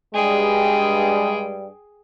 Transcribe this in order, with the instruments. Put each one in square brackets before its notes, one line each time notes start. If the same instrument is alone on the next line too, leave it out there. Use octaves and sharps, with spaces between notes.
[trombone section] G2 G3 [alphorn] G#3 [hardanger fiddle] G#4 G5